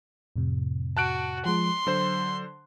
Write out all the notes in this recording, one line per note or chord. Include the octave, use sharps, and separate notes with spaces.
F2 A2 C3
F#4 A5 F#6 D7
F3 G#3 C6
D3 F#3 C5